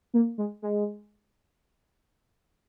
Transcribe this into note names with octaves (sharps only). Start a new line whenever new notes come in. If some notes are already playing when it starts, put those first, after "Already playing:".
A#3
G#3
G#3